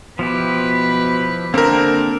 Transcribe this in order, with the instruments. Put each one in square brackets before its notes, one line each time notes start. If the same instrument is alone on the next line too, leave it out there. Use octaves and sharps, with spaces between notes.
[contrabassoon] B2 [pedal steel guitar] F3 E4 G4 [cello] B4
[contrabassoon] D3 [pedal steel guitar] A#3 G4 A4 [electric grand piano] C4 A#4